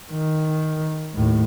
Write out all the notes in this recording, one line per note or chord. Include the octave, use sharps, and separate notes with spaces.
D#3
D#2 A2